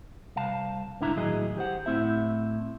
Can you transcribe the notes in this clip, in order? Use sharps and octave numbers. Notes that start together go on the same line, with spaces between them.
C2 F5 A5
G#2 D3 D4 E4 E5 A#5
D#2 A2 F#3 E4 G#4 D#5
G4 C5 F#5
A2 C4 E4 E5